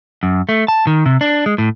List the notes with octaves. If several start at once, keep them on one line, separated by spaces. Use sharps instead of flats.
F#2
A3
A5
D#3
C3
D4
G#3
A2